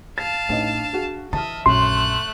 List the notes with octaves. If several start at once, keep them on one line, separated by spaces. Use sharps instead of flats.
F5 A5 A6
A1 D4 D#4 D#5
F#4 G#4
E3 D#5 E5 A5 F6
A#1 F#2 A3 C6 F#6